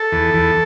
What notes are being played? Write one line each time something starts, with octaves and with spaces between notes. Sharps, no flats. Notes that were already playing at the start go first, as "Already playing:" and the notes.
Already playing: A4
E2
E2